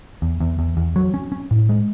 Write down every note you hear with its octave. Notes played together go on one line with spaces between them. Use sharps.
E2
E2
E2
E2
F#3
C#4
C#4
A2
G#3